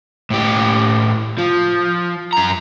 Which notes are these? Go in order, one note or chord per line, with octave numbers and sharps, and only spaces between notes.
A2 G4
F3
F#2 A#5